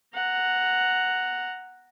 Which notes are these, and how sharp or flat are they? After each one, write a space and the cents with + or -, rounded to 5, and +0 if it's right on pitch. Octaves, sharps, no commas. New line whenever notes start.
F#5 +0 A#5 -5